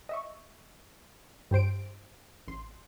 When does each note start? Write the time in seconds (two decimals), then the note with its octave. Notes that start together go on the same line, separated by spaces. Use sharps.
0.09 D#5 E5 C#6
1.51 G2 G4 C5 D7
2.48 A1 C6